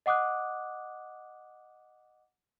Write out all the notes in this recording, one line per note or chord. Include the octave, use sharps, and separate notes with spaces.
D#5 F#5 D6 D#6 F#6